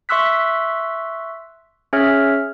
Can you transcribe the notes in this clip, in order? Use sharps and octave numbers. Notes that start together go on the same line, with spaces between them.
E5 C6 C#6 E6 F#6 B6
C#4 G#4 C#5 E5 F6